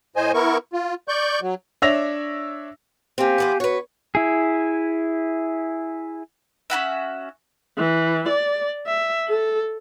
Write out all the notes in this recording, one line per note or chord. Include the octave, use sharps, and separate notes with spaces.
A2 C5 D#5 G#5
B3 E4 A#4 C#6
F4
D5 C#6 G6
F#3
D4 C#5 E5 E6 A#6 F7
A#3 C4 G4 F5 G#5
E3 B3 C5
F#4 B4 C#5
E4 G#4
C#4 E4 F#4 E5
E3
D5
E5
A4